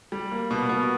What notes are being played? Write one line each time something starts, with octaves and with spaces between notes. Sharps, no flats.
G3
A#3
B2
B2